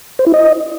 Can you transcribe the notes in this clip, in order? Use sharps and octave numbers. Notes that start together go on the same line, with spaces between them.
C5
E4
D#5